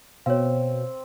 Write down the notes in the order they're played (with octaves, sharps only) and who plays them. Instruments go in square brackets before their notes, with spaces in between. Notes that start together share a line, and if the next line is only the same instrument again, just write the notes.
[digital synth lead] B2 [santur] C4 [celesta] C#5 F5